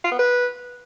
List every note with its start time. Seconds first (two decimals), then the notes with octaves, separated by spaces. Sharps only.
0.04 F4
0.12 B3
0.19 B4